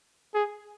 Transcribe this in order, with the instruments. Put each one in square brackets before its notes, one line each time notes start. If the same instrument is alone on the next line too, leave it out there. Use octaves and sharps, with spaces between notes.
[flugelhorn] G#4